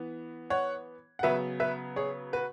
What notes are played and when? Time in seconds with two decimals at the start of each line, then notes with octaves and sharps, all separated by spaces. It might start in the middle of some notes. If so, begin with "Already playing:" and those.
Already playing: E3 B3
0.50 C#5 F#5
1.19 F#5
1.23 C#3 F#3 B3 B4 E5
1.60 B4 E5
1.96 G#4 C#5
2.33 F#4 B4